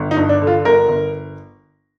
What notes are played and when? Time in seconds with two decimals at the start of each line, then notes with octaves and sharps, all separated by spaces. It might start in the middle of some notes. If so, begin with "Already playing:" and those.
Already playing: G1
0.11 D#4
0.17 G2
0.29 D4
0.42 D3
0.47 F4
0.65 G1 A#4
0.88 G1